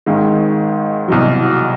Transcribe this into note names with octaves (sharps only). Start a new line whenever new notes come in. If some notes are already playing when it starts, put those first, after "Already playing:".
G#1 G#2 D#3 G#3
C2 B2 F#3